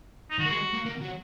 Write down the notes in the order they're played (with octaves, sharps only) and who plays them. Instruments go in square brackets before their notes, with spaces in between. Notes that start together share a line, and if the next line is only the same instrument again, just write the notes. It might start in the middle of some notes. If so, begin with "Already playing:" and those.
[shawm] D#4
[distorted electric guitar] D#3 [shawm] F#4
[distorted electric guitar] A#3
G#3
A#3
A#3
F#3